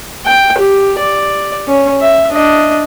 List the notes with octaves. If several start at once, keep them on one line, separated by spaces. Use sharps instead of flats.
G5
G4
D5
C#4
E5
D4 D#5